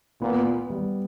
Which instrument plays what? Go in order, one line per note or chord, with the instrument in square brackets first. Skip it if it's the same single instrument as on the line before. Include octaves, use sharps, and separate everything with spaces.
[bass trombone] A#2 [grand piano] B3
[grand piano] B3
G3